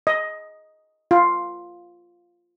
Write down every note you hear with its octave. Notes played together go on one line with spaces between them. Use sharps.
D#5
F4